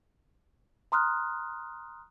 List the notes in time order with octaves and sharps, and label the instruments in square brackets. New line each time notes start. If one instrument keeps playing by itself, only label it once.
[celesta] A#5 C6 D#6 F6 F#6